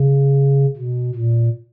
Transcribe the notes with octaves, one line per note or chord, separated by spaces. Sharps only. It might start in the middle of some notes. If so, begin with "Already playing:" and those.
Already playing: C#3
B2
A#2